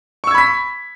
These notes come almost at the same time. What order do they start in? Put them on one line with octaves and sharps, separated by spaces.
C#6 E6 G#6 B5 B6